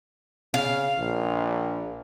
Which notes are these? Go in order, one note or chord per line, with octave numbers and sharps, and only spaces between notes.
C#3 F5
A#1